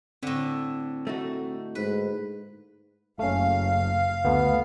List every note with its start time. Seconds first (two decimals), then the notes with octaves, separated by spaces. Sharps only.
0.23 A2 D3 C4
1.07 A3 D#4 F#4
1.75 G#2 B4
3.19 F#1 A3 C#4 F5
4.25 D2 A3 B3